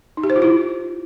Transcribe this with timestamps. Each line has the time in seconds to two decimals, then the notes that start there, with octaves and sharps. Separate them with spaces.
0.17 D#4
0.23 G4
0.30 C5
0.36 F4
0.42 E4